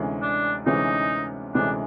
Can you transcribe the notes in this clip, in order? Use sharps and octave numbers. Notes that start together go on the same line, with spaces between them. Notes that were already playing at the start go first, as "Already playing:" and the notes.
Already playing: D2 C3 E3 G#3 C#4
D4
D2 C3 E3 G#3 C#4 D#4
D2 C3 E3 G#3 C#4 D4